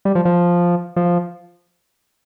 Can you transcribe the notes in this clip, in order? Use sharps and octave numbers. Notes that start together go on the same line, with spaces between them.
G3
F3
F3
F3